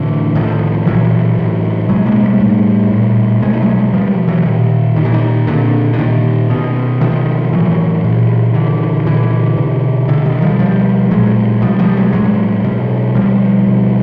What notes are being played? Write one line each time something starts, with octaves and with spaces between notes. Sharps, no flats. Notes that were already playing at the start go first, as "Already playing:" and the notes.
Already playing: A2 D3 E3
A2 D#3 F3
A#2 E3 F#3
A2
B2 F#3 G#3
G#3 A#3
G3 A3
A2
A#2
B2 G#3
A3
F#3 G#3
B2 F3 G3
E3 F#3
A#2 D#3
A#2 D#3
E3
D#3
A#2 D3
D3
A#2 D#3
B2
B2 D#3 F3
A2 E3 F#3
A#2
A#2 D3 E3
A#2 D3 E3
B2
B2 D3
D#3
F3 G3
B2 F3 G3
A#2 F#3 G#3
B2 F3 G3
F3 G3
F#3 G#3
A2 F#3 G#3
B2
B2 F3 G3
B2